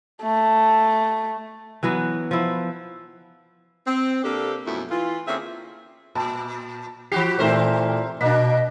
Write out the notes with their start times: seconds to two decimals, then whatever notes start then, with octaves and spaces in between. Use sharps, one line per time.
0.23 A3
1.83 E3 F#3 B3 F#4
2.31 F3 E4
3.87 C4
4.24 C3 A#3 D4 G4 A4
4.66 F#2 B2 F3 A3 E4
4.91 E3 F4
5.27 D3 A#3 C4 C#4 G#4 E5
6.15 A#2 A5
7.12 E3 F#4 G4 C7
7.39 A#2 E3 A3 C4 E4 A#4 C5
8.21 B2 A#3 D4 D#5 B6